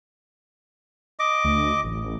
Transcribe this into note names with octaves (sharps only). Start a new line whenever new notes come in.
D#5 D6
D2
A1